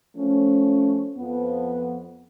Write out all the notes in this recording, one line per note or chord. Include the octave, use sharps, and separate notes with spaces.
F3 A3 C#4
F2 F3 B3